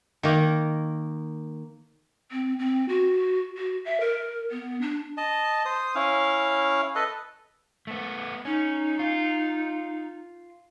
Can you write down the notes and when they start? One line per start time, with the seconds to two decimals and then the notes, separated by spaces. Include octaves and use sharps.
0.23 D#3 A#3
2.32 C4
2.59 C4
2.89 F#4
3.57 F#4
3.85 E5
4.00 A#4
4.51 B3
4.81 D4
5.17 D#5 A5
5.65 C5 D#6
5.95 C#4 E4 F5
6.95 A4 B4 D#5
7.87 A3 B3
8.45 C#4 D#4
8.99 F4